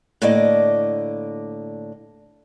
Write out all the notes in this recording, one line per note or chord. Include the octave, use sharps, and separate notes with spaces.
A2 D3 A#3 D5 D#5